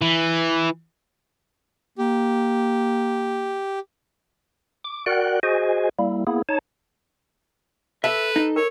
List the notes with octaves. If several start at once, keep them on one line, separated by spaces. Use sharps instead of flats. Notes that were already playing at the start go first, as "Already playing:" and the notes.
E3
A#3 G4
D6
F#4 A#4 D5 F#5 G5 F#6
F#4 G#4 C5 D#5 G#5
G3 A#3 E4
A#3 B3 E4 G#4
D#4 C#5 A5
A4 B4 E5
D#4
A#4 C#5